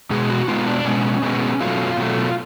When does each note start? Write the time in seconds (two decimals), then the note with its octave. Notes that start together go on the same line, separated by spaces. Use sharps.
0.11 B2 G#3 B3 G#4
0.30 F#4
0.48 B2 G#3 B3 F4
0.67 D4
0.85 B2 G#3 B3 C#4
1.22 B2 G#3 B3
1.60 B2 F#3 A3 F4
1.97 B2 F#3 A3